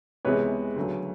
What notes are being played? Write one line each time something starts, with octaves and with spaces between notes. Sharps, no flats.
C#2 C3 E3 G#3 B3 B4 C#5
D2 C#3 F#3 A3